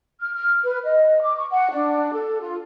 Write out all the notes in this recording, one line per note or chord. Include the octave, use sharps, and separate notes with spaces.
F6
F6
B4
D#5
D6
C#6
F#5
D4
A4
F4